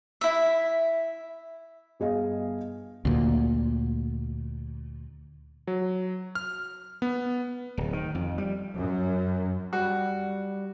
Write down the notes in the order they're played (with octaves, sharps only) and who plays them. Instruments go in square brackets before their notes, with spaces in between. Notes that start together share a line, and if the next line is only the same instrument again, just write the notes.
[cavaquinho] E4 E5
[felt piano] G1 G#4 D#5 F5
[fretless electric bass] D2 A#2
[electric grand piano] F#3
F6
B3
[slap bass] D1
D#3
F2
G3
[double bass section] F#2
[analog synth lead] G3 [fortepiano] F#4